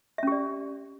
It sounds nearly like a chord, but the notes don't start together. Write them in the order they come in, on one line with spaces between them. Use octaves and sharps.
E5 C#4 G4 D5